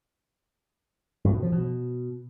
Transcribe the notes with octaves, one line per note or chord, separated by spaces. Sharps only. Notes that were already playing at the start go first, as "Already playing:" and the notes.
G2
B2
F3
B2